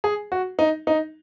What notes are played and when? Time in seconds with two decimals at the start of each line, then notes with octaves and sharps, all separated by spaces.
0.04 G#4
0.32 F#4
0.59 D#4
0.87 D#4